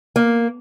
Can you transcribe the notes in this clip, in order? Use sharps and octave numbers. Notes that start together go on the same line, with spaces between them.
A#3